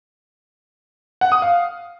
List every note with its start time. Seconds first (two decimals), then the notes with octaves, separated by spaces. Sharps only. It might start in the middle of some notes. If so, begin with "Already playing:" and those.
1.21 F#5
1.32 D#6
1.42 F5